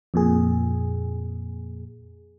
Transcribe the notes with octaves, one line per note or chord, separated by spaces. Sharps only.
F2 A#2 G#4